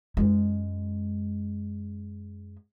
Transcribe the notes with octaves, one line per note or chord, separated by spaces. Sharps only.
F#2 G#3